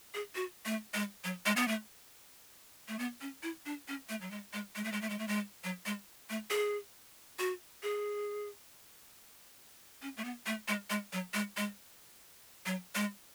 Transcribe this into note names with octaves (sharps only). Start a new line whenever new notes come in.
G#4
F#4
A3
G#3
F#3
G#3
B3
A3
A3
B3
C#4
E4
D4
C#4
A3
F#3
G#3
G#3
G#3
A3
G#3
A3
G#3
A3
G#3
F#3
G#3
A3
G#4
F#4
G#4
C#4
A3
B3
A3
G#3
G#3
F#3
G#3
G#3
F#3
G#3